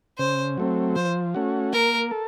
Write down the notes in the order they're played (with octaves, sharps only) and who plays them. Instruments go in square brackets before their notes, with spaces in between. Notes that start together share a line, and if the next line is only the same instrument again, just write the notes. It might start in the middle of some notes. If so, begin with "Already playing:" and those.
[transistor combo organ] C#3 [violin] C5
[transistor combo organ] F#3 A3 C4
[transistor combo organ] F3 [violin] C5
[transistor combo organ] A3 C#4 F#4
[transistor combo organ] A#3 [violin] A#4
[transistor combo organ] A4